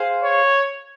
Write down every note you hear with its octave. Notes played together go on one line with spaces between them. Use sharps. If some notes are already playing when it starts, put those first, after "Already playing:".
Already playing: G#4 C5 F5
C#5